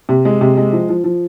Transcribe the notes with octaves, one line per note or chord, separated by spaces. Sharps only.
C3
G#3
C3
G#3
F3
F3
F3